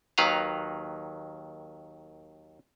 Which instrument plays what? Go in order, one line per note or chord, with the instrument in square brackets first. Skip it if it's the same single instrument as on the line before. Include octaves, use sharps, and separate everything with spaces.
[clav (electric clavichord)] D#2 D#3 F#3 B4 F5 A#5